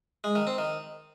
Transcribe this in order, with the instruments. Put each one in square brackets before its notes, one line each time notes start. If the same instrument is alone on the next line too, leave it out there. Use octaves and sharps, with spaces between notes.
[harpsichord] G#3
D#3
C4
D#3